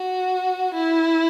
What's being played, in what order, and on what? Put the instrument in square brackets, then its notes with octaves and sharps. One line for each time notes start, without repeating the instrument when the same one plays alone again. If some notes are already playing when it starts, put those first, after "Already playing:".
Already playing: [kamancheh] F#4
E4